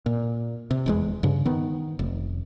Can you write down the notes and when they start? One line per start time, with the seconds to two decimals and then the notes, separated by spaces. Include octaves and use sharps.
0.06 A#2
0.71 C3
0.86 F1 E2 G#3
1.23 G2 C#3
1.46 D#3 B3
1.99 F1